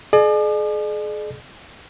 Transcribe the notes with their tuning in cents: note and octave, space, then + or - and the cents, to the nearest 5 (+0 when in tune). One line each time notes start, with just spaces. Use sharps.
G#4 +40 D5 +45